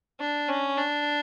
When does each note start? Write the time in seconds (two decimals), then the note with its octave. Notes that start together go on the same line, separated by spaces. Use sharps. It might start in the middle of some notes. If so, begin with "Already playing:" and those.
0.20 D4
0.49 C#4
0.78 D4